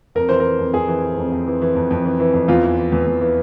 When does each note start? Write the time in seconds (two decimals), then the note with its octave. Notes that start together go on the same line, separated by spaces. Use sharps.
0.15 F2 A#4
0.29 E3 C5
0.40 E3 A#4
0.59 F2
0.74 F2 G#4
0.88 E3
1.03 E3
1.17 F2
1.32 F2
1.47 E3
1.62 E3
1.75 F2
1.91 F2
2.05 E3
2.20 E3
2.34 F2
2.48 E2 F4
2.63 E3
2.78 E3
2.92 E2
3.06 E2
3.21 E3